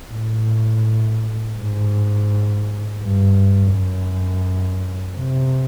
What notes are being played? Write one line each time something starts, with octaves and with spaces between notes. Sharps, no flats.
A2
G#2
G2
F#2
C3